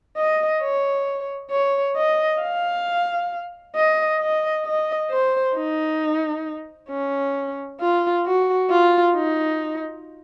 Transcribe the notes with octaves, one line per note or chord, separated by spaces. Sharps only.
D#5
C#5
C#5
D#5
F5
D#5
D#5
D#5
C5
D#4
C#4
F4
F#4
F4
D#4